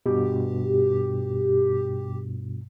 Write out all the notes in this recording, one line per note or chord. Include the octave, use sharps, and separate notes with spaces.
G2 B2 G4